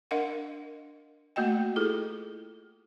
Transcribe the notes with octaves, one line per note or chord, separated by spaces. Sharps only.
D4 A#4 D#5 F5 F#5
A3 A#3 F#4 D#5 G5
E4 F4 G#4 A4